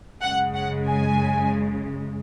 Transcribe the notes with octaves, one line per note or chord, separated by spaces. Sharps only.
F#2 C#3 G#3 F#5
F#5
G#5